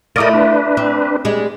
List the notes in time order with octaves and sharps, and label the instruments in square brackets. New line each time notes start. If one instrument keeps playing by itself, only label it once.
[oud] A3 E4 F4 [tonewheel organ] A#4 D5 D#5
[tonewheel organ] D4 B4
[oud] C4
G3 G#3